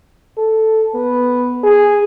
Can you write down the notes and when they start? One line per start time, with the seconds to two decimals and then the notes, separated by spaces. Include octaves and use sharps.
0.38 A4
0.95 B3
1.64 G#4